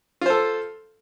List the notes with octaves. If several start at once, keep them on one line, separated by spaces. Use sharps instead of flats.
F4 A4 C5